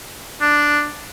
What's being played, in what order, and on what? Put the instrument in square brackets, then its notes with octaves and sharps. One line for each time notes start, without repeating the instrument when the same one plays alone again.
[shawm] D4